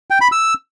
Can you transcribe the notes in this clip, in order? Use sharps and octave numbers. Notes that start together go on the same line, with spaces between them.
G5
B5
E6